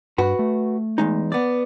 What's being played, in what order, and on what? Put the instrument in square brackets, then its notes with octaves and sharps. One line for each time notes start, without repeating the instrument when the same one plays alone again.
[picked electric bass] G2 [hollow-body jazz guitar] F#4 B4
[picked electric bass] A3
[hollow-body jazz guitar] E2 G#3 D#4
B3 D5